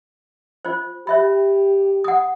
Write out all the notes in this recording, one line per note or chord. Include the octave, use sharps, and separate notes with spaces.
F4 C5
G4 C#5 E5 B5
F#5 D#6